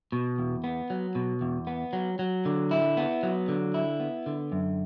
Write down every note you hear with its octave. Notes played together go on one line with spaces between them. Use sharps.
B2
E2
B3
F#3
B2
E2
B3
F#3
F#3
D3
E4
B3
F#3
D3
E4
B3
D3
F#2